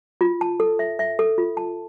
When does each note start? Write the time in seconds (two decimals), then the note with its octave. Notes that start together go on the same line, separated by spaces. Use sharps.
0.21 F4
0.41 A5
0.60 A4
0.79 E5
0.99 E5
1.19 A4
1.38 F4
1.57 A5